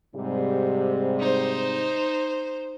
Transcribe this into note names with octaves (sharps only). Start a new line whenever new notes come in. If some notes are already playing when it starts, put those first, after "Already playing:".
G#2 C3 G3
D#4 C5